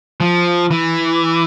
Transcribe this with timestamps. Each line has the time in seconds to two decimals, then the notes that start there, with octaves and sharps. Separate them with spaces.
0.20 F3
0.71 E3